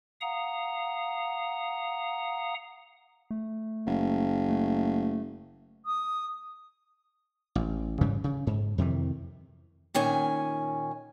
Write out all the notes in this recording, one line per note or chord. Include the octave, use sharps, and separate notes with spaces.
F5 F#5 A#5 D#6
A3
F#1
A3
D#6
A1
G#2 C#3 E3 G3
C#3
G#2
F2 C3 D#3 E3
A#2 D#3 C#4 G#5